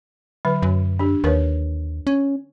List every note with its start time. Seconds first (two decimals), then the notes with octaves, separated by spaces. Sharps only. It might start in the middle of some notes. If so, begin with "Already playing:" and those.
0.45 D3 F#3 B4
0.62 F#2
0.99 D4 G4
1.24 D#2 A#4 B4 C#5
2.07 C#4